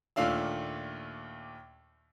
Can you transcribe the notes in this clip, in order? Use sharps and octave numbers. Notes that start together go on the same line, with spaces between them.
D#2 A#2 A3 D4 F5 E6